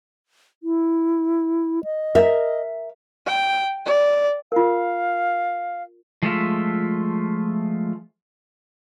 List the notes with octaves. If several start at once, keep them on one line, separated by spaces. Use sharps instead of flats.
E4
D#5
A#4 E5
G5
D5
F4 A#4 F5
F3 G#3 A3 F4 E5